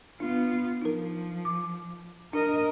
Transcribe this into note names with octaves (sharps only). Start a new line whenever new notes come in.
B3 D4 F4
F3 D#4 A#4
D6
D4 A#4 D#5